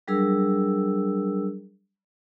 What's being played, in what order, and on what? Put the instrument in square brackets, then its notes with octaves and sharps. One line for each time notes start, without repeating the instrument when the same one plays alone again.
[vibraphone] F#3 G3 D4 G#4 A#4 E6